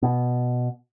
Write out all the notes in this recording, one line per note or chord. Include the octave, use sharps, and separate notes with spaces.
B2